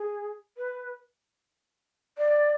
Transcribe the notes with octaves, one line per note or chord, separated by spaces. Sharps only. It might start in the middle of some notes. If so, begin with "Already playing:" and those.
Already playing: G#4
B4
D5